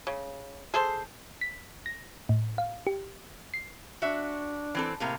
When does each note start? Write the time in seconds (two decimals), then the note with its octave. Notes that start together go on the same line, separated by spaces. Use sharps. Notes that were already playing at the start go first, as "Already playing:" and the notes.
0.07 C#3
0.74 G#4 A4 C5
1.41 B6
1.86 A#6
2.29 A2
2.58 F5
2.87 G4
3.54 C7
4.02 D4 F#4 E5
4.75 E3 C4 A4
5.00 A2 C3 A#3